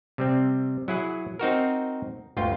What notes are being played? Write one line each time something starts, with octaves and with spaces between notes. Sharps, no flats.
C3 G3 C4
F#3 E4 G#4 F#5
C4 D#4 F#4 A#4
G1 D2 F4 G5